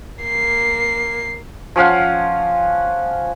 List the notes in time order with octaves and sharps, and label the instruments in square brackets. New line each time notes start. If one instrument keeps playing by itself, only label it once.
[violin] A#3 C7
[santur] F3 C#4 F5 F#5